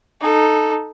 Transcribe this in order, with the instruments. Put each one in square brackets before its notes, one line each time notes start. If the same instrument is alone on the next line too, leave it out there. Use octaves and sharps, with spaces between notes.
[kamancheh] D#4 A4